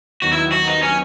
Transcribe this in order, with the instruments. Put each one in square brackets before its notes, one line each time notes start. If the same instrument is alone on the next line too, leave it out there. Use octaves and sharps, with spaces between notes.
[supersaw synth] D#2 D#3 F#3 B3 D#4 [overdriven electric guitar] F#4
[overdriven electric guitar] E4
F#4
D#4
C#4